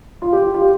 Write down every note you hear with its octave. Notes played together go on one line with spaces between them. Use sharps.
F4
G4
F4
G4